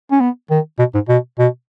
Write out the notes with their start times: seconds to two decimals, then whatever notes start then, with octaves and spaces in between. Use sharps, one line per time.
0.12 C#4
0.21 B3
0.50 D#3
0.79 B2
0.94 G#2
1.08 B2
1.39 B2